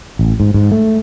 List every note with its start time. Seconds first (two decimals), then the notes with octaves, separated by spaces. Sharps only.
0.19 A1
0.40 G#2
0.54 G#2
0.72 A3